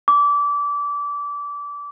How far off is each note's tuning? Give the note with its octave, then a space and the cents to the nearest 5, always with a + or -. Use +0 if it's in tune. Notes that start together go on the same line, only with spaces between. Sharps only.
D6 -25